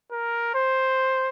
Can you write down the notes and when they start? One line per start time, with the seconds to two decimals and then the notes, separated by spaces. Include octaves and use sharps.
0.12 A#4
0.54 C5